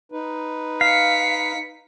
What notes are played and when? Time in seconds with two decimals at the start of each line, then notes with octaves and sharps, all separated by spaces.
0.12 D#4 B4
0.81 F5 B6 C#7